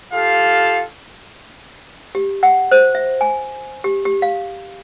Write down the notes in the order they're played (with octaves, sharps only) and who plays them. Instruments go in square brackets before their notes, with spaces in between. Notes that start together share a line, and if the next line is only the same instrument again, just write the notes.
[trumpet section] F4 G4 A4 F5
[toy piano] G4
F#5
C5
E5
G#5
G4
G4
F5